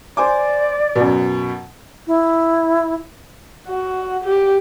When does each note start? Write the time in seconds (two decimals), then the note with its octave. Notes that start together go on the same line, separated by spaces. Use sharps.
0.17 C5 D5 G#5 D6
0.95 F#2 B2
2.07 E4
3.68 F#4
4.24 G4